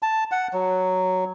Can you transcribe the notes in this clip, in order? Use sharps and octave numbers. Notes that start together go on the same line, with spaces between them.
A5
F#5
F#3